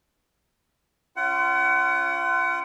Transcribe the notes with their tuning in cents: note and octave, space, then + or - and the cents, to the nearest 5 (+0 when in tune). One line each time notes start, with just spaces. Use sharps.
C#4 +0 F4 -20 F#5 +35